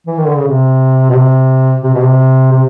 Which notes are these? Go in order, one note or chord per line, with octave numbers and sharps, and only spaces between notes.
E3
D#3
D3
C#3
C3
B2
C3
C3
B2
C3
C3